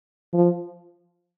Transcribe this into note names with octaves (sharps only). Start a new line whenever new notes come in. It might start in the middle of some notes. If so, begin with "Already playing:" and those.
F3